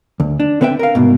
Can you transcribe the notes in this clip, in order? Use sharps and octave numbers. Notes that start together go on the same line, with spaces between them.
D2
D4
D3 C4 B4 E5 G5
A#4 F5
C2 G#2 B2